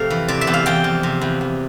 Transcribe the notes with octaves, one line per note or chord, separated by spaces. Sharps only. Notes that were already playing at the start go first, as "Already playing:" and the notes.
Already playing: F2 C3 A3 F5
E3
C3 D5
E5
E2
F5
E2 G5
F3
C3
E2
E2